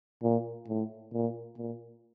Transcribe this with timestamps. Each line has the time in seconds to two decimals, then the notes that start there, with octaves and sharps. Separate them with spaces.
0.23 A#2
0.68 A2
1.13 A#2
1.58 A#2